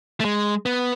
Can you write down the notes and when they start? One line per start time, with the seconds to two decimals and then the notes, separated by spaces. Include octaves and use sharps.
0.20 A3
0.25 G#3
0.66 B3